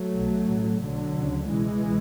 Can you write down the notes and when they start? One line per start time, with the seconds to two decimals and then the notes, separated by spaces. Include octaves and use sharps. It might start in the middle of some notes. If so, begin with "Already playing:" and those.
Already playing: F#3 A3
0.13 B1 B2
0.48 A1 A2
0.82 B1 B2 D3 F#3
1.16 D2 C#3
1.49 C#2 B2 E3 G#3